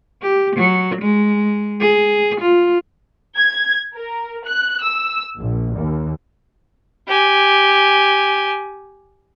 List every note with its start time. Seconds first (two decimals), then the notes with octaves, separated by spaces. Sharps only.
0.22 G4
0.56 F#3
1.02 G#3
1.80 G#4
2.41 F4
3.38 G#6
3.96 A#4
4.46 F#6
4.83 E6
5.38 A#1
5.74 D#2
7.08 G4 G#5